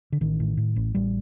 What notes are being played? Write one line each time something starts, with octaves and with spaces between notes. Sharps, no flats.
D3
A1 D#3
A2
A2
A1
A1 G3